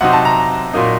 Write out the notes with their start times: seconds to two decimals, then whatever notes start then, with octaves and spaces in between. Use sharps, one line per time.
0.01 C3 F#3 C4 D#4 F#5
0.13 A5
0.25 A#5
0.74 A#2 F#3 A#3 D#4